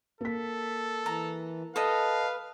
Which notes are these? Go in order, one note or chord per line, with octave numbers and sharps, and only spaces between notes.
A#3 A4 B6
E3 A#5
A4 B4 D#5 F5